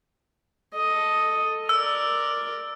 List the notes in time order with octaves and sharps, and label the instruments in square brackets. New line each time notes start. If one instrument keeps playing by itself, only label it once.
[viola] A4 D#5
[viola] A#4 D5 [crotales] E6